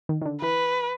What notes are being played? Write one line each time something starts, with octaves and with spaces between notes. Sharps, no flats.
D#3
D#3
D3
E3 B4